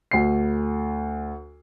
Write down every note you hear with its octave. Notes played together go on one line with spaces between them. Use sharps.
D2 C7